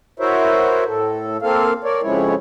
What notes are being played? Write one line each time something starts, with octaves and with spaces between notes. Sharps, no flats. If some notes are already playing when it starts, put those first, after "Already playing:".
E4 F#4 A#4 C5 C#5 E5
A2 A4
A#3 C4 A4 F5
A#4 C#5 D5
F2 C#3 F3 G#3 E4 C#5